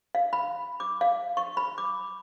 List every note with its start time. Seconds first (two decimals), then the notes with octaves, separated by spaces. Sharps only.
0.15 F5
0.33 B5
0.80 D6
1.01 F5
1.37 C#6
1.57 B5
1.78 D6